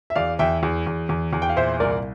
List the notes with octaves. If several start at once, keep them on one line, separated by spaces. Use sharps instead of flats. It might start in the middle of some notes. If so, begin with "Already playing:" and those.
E5
E2 D5 F5
E2 E5 G5
E2
E2
E2
E2
G5
F5
A#2 C5 E5
C2 A#4 D5